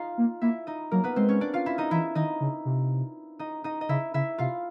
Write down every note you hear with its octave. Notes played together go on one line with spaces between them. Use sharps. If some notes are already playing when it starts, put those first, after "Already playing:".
Already playing: D#4 F4 D#5 F5
A#3
A#3 E4 E5
D#4 D#5
F#3 A#3 A#4
B3 B4
G#3 C4 C5
C#4 C#5
D4 D5
F4 F5
E4 E5
D#4 D#5
E3 E4 E5
D#3 D#4 D#5
C#3
C3
D#4 D#5
D#4 D#5
D#5
C#3 E4 E5
C#3 E4 E5
C3 F4 F5